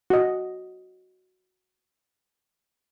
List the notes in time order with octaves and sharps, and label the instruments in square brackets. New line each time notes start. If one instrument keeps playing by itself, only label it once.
[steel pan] F#4 D#5